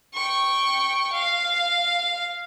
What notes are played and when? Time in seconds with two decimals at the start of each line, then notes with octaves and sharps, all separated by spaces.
0.14 G5 C#6
1.13 F5